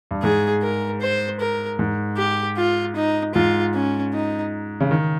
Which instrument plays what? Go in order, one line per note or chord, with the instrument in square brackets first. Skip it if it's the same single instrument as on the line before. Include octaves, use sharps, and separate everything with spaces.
[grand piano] G2
[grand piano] G#2 [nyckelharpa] G#4
[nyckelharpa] A#4
C5
A#4
[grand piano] G#2
[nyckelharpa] G4
F4
D#4
[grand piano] G#2 [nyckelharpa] F4
[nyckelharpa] C#4
D#4
[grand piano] C#3
D#3